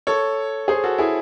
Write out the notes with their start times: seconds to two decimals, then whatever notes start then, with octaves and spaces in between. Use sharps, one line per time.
0.07 A4 C#5
0.68 G#4 C5
0.84 F#4 A4
0.98 E4 G#4